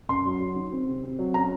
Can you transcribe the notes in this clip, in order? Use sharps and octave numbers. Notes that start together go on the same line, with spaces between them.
F#2 C6
F#3
F#3
D#3
C4
C3
C4
F#3
C#4 A#5